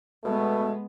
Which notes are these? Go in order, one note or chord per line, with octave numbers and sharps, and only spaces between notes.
B2 G#3 A3 B3